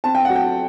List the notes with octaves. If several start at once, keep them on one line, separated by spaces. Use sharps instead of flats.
C4 A5
G5
F#3 F#5
G5